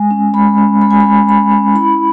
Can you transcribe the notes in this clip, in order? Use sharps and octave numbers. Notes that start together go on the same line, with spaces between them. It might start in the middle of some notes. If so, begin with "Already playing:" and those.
Already playing: G#3 G#5
C#4
G#3 B5
C#4
G#3 B5
G#5
G#3 B5
G#3 B5
C#4
E4 B5